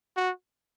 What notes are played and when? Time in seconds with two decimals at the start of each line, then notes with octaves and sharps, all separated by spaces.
0.17 F#4